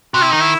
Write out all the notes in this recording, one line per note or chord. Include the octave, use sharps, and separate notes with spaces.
C3 F#4
E4
D#3 D#4
E4